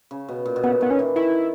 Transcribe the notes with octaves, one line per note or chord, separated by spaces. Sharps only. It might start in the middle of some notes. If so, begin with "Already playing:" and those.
C#3
B2
A#2
B2
C#3 B3
D#3 B3
C#4
E3
D#3 E4